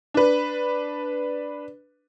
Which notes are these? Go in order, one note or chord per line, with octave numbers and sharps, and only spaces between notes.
D4 B4